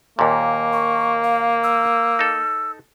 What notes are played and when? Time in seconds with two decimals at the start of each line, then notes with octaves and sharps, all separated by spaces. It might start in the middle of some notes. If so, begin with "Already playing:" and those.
0.19 D#2 A#2 A#3
0.73 C#6
1.24 F5
1.64 E6
2.19 D#4 A4